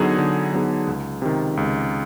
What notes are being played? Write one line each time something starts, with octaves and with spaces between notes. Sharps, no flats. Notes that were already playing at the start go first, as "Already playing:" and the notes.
Already playing: D3 F#3 B3 D#4 G#4
D3
F#3 B3 D#4 G#4
C#2
C3 D#3
C#2